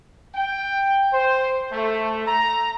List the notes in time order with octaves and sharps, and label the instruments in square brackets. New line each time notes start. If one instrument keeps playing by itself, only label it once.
[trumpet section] G5
C5
A3
A#5